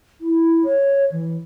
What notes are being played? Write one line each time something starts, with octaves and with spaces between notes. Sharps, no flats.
E4
C#5
E3